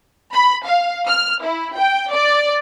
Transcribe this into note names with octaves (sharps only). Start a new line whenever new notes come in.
B5
F5
F6
E4
G5
D5